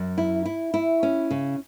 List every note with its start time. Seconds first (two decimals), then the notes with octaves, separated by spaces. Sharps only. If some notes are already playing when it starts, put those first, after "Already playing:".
Already playing: F#2
0.18 E4
0.46 E4
0.74 E4
1.03 C#4
1.31 C#3